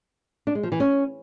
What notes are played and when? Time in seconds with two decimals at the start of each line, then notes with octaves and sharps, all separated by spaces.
0.47 D4
0.55 G#3
0.63 F3
0.72 E3
0.80 C#4